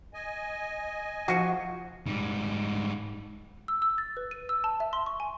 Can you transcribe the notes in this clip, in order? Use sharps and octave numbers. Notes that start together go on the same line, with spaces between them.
D#5 G#5
F3 F#4 F5
G#2 G3
E6
E6
A6
B4
D#7
E6
A5
E5
C6
C#6
G#5